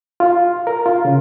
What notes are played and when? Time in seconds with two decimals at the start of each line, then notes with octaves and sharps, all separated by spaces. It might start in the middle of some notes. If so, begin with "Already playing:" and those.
0.20 F4
0.67 A#4
0.86 F4
1.05 C#3